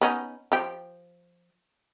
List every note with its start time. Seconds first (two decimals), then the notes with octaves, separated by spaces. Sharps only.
0.01 B3 C#4 D#4
0.52 F3 G4